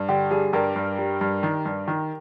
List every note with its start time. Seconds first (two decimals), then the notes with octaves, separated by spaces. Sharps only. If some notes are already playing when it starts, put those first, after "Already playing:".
Already playing: G2
0.09 D3 G4
0.31 G3 G#4
0.53 G2 G4 A#4
0.76 G2
0.98 G3
1.21 G2
1.43 D#3
1.65 G2
1.88 D#3